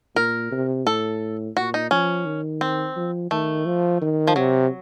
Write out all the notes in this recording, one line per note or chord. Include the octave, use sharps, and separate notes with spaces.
A#2 A#4
C3
A2 A4
A#2 F#4
D#4
F3 C#4
D#3
C4
F3
D#3 A3
F3
D#3
F3
C3 F#3